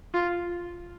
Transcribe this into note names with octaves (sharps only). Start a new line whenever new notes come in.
F4